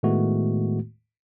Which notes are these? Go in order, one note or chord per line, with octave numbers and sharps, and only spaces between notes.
A2 D#3 G#3 A3 B3 F#4